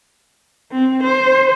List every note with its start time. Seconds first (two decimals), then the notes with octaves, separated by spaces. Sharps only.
0.72 C4
1.04 C5